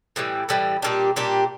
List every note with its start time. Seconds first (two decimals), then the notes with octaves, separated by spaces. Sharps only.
0.16 A2 E3 G3
0.49 A2 E3 G3
0.82 A#2 G3 D4 G4
1.16 A#2 G3 D4 G4